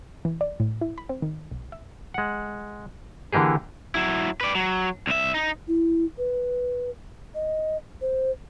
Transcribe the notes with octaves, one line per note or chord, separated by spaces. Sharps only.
E3
D5
A2
E4
B5
C4
D#3
B1
E5
G#3 F#5
D3 E3 A#3 G4 G#4
F#3 E4
B4 D5
F#3
C2 E5
D#4
E4
B4
D#5
C5